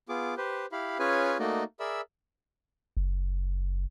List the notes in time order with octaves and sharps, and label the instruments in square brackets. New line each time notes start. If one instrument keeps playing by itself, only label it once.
[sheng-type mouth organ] B3 F4 G#4 D6
G4 B4 C5
E4 G4 F5 B5
C#4 F4 G#4 B4 C#5 G#5
A3 A#3 D#4 F#4 D5 D#5
G#4 A#4 D5 E5 B5 E6
[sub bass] F#1